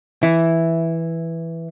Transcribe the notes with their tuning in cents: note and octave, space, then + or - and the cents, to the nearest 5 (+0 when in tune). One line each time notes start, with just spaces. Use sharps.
E3 +0 E4 +0